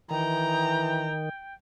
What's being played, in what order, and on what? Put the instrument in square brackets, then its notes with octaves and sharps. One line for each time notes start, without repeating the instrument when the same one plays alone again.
[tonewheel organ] D#3 [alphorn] E3 [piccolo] G5 [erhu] A#5